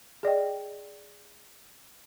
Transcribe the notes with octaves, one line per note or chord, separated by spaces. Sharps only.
G#4 D5 D#5 G5